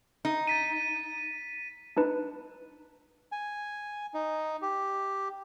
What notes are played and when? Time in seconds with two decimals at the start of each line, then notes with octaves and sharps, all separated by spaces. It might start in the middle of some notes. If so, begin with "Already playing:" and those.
0.25 D#4
0.47 A6 B6 D#7
1.97 D4 D#4 B4
3.32 G#5
4.14 D#4
4.62 G4